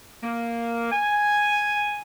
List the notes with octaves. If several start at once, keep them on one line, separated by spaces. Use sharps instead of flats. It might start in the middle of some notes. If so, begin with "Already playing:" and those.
A#3
G#5